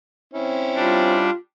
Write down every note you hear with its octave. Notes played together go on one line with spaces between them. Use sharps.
C4 C#4 E4
G3 D4 F4